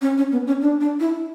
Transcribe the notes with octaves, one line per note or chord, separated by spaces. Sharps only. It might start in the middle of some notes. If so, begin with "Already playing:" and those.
C#4
C#4
B3
C#4
D4
D4
E4